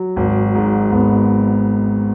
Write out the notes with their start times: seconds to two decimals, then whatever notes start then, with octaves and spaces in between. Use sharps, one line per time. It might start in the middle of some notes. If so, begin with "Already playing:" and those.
Already playing: F#3
0.16 G#1
0.55 G#2
0.92 G#1 B3